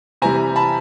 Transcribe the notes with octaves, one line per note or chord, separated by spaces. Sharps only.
C3 E3 G3 G#5 A#5
A5 B5